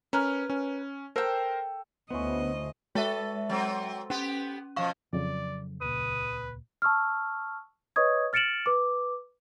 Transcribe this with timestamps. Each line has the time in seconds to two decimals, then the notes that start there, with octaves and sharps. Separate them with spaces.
0.13 C#4 A#4 B4
0.50 C#4
1.16 A4 A#4 C5 G5
2.10 D2 B3 C#4 E4 C5 D#5
2.95 G#3 A4 B4 E5
3.49 F#3 C4
4.10 B3 C#4 G4
4.76 B2 F3 F5 C#6
5.13 F2 C#3 F#3 D5
5.81 D#1 C#2 A#2 B4 D#6
6.82 A5 C#6 E6 F6
7.96 B4 C#5 D#5 C#6 D#6 G#6
8.33 F6 A6 C#7 D7 E7 F#7
8.66 B4 D6